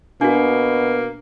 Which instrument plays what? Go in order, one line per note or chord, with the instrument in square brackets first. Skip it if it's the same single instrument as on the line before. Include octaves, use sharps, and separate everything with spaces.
[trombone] B2 [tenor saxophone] A#3 [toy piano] D4 F#4